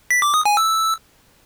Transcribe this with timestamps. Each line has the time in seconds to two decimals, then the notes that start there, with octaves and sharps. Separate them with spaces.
0.11 B6
0.22 D6
0.34 D#6
0.45 G#5
0.57 E6